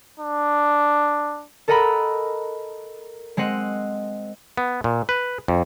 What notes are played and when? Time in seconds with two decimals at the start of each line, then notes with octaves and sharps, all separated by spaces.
0.20 D4
1.68 A4 A#4 D#5 F#5 A#5 B5
3.37 G#3 C4 D#5 F#5
4.58 B3
4.84 A#2
5.09 B4
5.48 F2